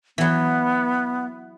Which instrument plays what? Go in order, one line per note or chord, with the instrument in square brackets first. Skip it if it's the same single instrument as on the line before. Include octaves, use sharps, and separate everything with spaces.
[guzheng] E3 F#3 [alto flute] B3